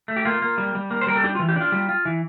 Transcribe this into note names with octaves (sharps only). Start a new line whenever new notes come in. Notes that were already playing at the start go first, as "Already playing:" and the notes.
A3
G4
A#3 F4
A#3
G3
G3
A#3
C5
G3 A#4
A4
D4 G4
F4
E3
G4
D4 F4
G3
F4
E3